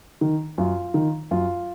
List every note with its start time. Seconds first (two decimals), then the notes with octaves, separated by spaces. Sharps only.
0.21 D#3
0.58 F#2 F4
0.94 D#3
1.31 F#2 F4